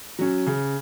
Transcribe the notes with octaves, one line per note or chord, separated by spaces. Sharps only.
F#3 C#4
C#3